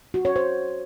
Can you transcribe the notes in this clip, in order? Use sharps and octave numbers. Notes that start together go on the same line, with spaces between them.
F#4
C#5
C5